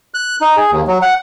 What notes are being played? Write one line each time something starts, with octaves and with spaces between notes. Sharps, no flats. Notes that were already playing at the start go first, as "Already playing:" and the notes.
F#6
D#4
G#4
D#2
F#3
F#5